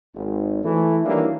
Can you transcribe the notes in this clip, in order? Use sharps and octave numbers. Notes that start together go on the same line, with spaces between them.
G#1
E3 A3
D#3 E3 F#3 G3 A#3 D4